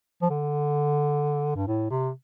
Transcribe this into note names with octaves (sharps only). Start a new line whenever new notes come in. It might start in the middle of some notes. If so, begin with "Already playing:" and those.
F3
D3
G2
A2
C3